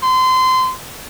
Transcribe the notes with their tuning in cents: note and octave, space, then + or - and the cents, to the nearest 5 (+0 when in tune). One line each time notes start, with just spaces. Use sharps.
C6 -25